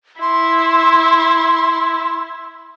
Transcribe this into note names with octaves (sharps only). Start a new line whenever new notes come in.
E4 C6